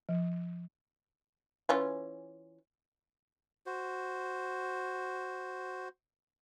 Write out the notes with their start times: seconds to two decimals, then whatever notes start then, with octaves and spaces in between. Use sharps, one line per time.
0.09 F3
1.69 E3 C#4 F4
3.66 F#4 C5